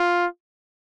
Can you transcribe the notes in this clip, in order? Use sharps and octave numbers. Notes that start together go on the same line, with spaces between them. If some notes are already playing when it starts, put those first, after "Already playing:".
Already playing: F4